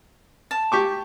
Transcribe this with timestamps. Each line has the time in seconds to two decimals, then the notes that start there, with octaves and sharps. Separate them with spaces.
0.51 A5
0.72 G4 C#6 D6